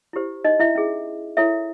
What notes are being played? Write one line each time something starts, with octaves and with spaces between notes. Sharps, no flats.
E4 G4 C5
D#4 D#5
E4 E5
C#4 E4 G#4
E4 A4 C#5 E5